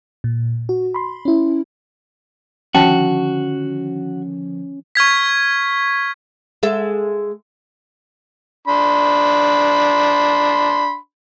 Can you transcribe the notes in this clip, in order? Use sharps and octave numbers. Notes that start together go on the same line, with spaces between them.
A#2
F#4
B5 C6
C#4 E4
D3 D#3 F3 C#4 F#4 G5 A5
C#6 F6 G#6 B6
G#3 A4 E5
D4 B5 C6